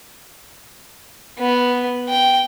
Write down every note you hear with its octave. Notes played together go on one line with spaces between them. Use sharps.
B3
G5